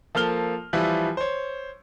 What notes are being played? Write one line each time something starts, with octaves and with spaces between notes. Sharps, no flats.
F3 A#3 A4 F6 G7
E3 F3 G3 E4
C5 C#5